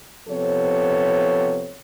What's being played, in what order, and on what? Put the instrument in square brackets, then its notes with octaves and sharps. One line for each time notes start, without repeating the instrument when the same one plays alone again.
[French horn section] C3 F3 B3 A4 C#5